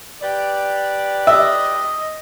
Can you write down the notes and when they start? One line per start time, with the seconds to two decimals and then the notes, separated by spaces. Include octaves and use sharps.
0.22 G4 B4 D5
1.27 D#5 E5